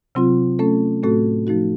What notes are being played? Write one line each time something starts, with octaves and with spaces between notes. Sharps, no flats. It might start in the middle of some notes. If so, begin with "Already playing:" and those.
C3 F#3 C4 F4
A3 C#4 A4
A2 A3 C4 F#4 A4
F3 A3 D#4 F#4